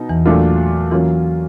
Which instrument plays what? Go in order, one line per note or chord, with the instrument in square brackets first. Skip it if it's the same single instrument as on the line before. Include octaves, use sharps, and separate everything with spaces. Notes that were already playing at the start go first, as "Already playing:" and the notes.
Already playing: [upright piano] B2 D#4
[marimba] E2 E3
[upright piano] A#2 F#3 A3 D4 F4
[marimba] E3 [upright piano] F#3 A#3 C#4 F4